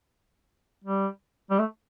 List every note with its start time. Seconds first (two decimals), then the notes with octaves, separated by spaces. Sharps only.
0.84 G3
1.50 G3
1.59 A3